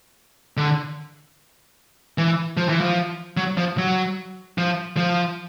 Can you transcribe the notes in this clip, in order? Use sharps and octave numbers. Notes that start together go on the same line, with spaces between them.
D3
E3
F3
E3
F3
F#3
F3
F#3
F3
F3